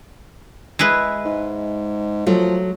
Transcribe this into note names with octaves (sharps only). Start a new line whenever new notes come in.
G#3 E4 B4
G#2
F3 F#3 A3